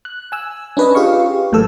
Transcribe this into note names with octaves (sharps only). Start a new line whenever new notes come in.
F#6
G#5 E6
C#4 D4 B4 C#5 D#5
F4 G4 G#4 F5 C#6
A1 A2 E3 F#3 A4 E6